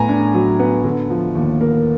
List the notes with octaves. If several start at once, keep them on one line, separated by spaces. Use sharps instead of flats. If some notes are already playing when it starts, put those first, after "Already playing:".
Already playing: A2 B3 G#5 A#5
D4
F#3
B3
D3
F3
D#2
A#3